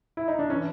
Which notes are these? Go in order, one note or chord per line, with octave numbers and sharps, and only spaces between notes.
E4
D#4
D4
C#4
E3